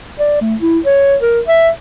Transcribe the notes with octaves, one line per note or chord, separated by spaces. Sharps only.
D5
A3
E4
C#5
A#4
E5